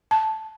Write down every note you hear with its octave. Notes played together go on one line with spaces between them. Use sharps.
A5